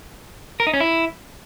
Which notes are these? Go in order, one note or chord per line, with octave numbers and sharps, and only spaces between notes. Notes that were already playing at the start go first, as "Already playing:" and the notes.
A#4
D#4
C#4
E4